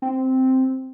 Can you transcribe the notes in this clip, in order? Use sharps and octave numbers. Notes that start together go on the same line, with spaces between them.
C4